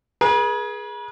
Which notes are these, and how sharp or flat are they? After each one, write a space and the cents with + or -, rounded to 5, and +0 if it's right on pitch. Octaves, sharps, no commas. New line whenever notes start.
G#4 +5 B4 -45